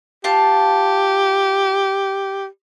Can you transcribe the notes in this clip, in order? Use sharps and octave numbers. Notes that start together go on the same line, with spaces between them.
F4 G4 A5